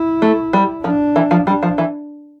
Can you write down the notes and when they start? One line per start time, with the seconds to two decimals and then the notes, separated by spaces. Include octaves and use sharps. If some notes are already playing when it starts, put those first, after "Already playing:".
Already playing: E4
0.22 A3
0.53 G3
0.84 F3 D4
1.16 E3
1.31 F3
1.47 G3 D4
1.63 F3
1.78 E3